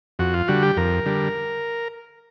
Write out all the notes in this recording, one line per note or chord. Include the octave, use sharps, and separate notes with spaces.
F2 F#4
F4
D3 G3 F#4
G4
F2 A#4
D3 G3